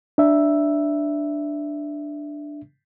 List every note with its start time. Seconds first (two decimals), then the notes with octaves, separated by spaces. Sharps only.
0.18 D4 E5